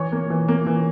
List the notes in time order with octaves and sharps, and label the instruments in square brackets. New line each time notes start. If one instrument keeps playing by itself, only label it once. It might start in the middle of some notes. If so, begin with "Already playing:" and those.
Already playing: [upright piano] E3 C#5 C#6
A#3
E3
A#3
E3